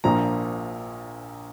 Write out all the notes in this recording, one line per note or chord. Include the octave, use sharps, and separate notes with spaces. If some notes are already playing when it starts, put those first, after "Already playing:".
A#1 A#2 F3 A#3 A#5